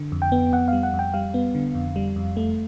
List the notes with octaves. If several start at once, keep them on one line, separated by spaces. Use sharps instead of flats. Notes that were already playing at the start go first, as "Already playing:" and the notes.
Already playing: D3
F2
G5
B3
F2 F#5
G3 F5
F#5
F2
G5
G3 F5
B3
D3
F2
G3
F2
A3